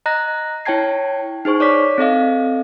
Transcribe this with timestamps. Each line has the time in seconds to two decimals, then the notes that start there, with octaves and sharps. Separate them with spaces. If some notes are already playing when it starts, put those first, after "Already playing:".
0.06 D#5 A#5 F#6 A#6
0.65 E4 C#5 G5 A5 G#6 C7
1.45 D#4 G#4 C5 C#6
1.60 C#5 D5 D6 B6
1.98 C4 A4 D#5 F5